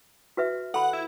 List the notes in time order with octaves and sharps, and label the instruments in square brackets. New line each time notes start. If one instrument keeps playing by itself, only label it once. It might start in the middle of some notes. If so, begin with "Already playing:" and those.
[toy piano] F#4 B4 E5
[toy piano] A4 B5 [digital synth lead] F#5
[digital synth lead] E4